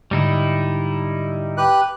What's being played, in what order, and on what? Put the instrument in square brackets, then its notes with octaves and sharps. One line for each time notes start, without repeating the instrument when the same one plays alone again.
[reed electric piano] G#2 D3 [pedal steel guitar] G3 D#4 E4
[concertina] G4 B4 F#6